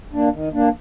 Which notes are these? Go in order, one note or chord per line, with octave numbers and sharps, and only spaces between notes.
A#3 D4
D#3
A#3 D4